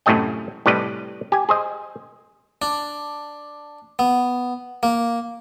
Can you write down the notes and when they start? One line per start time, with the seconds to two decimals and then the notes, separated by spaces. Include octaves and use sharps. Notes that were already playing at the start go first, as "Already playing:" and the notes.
0.06 F#2 A2 C3 A3 D#5 G5
0.66 A2 C3 G3 B4 D5 D#5
1.32 G4 G#5
1.49 G#4 C5 D#5
2.62 D4
3.99 B3
4.83 A#3